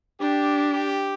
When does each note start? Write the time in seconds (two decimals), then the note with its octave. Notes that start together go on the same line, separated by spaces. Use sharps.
0.20 D4 G4
0.72 G4